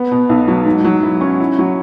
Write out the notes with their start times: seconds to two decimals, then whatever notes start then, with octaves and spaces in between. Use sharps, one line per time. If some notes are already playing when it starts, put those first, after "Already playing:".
Already playing: B3
0.11 B2
0.29 B1
0.48 F#3
0.65 G#2
0.84 F#3
1.03 E4
1.21 C#4
1.40 E4
1.59 F#3